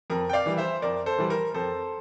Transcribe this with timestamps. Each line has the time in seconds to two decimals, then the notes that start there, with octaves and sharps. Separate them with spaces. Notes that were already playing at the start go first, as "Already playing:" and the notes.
0.10 F2 A#4
0.29 G5
0.33 D5 F5
0.46 E3 G3
0.57 C5 E5
0.82 F2 A#4 D5
1.06 A4 C5
1.18 E3 G3
1.30 A#4
1.54 F2 A4 C5